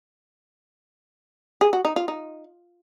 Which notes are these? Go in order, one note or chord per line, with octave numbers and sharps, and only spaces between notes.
G#4
F#4
D#4
F4
D#4